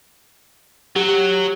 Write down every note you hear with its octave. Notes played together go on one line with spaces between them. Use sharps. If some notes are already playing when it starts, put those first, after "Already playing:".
F#3 G4